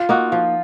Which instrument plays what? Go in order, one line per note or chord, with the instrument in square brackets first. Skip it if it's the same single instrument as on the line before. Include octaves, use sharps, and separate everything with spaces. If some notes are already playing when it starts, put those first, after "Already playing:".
Already playing: [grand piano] F4
[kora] A#3 D#4 F#4
F3